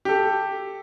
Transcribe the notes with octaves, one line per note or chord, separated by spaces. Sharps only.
G4 A4